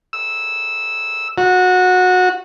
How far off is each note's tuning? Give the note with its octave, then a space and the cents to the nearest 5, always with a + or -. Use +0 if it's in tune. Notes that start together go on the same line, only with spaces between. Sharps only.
E6 -5
F#4 -20